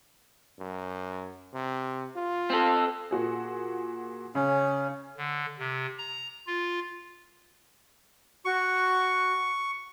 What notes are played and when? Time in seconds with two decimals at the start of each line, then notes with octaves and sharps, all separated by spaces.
0.59 F#2
1.53 C3
2.16 F4
2.50 C4 A4
3.11 A#2 F#4 G#4
4.35 C#3 C#4
5.17 D3
5.59 C3
5.98 A#5
6.47 F4
8.45 F#4 C#6